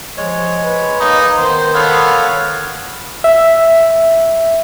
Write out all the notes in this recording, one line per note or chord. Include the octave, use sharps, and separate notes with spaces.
F3 G#3 C#5
B4
G#3 A#3 D#4
D#3 B3 C5
B3 A4 C#5 F5
E5